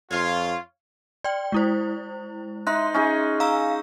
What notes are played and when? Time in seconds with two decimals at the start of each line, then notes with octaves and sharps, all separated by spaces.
0.11 F2 F4 C#5 F5
1.24 D5 G5
1.52 G#3 E4 C5
2.67 D#4 E5 C6 F#6
2.94 C#4 D#4 G#4
3.40 F5 A#5 E6